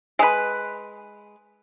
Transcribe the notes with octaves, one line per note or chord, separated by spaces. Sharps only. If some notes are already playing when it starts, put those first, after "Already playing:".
G#3 B4